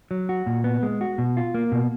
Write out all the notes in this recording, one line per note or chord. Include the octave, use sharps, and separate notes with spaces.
F#3
F#4
A#2
B3
G#3
F#4
B2
F4
A#3
B2